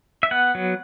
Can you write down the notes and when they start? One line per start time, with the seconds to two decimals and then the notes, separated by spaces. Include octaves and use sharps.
0.23 E5
0.31 B3 F#5
0.55 F#3